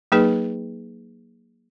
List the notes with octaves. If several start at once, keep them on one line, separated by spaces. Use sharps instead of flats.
F#3 A#3 D#4 G#4 B4